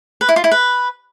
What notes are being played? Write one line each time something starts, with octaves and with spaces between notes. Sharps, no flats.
B4
E4
F4
E4
B4